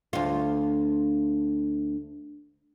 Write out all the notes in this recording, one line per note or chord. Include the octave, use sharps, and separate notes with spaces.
D2 F4